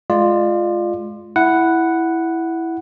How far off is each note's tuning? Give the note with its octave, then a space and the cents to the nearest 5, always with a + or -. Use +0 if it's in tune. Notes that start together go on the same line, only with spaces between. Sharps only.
G#3 +25 F4 +0 D5 +35
E4 +0 F#5 +0